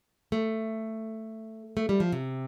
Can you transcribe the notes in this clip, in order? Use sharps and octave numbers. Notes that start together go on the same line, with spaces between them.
A3
A3
G3
F3
C3